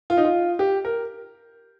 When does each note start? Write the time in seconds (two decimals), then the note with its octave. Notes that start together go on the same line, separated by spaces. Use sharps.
0.10 F4
0.17 D#4
0.24 F4
0.59 G4
0.85 A#4